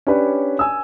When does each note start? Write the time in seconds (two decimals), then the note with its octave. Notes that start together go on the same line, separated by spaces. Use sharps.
0.07 C#4 D4 G4 B4 C#5 D5
0.59 G#5 E6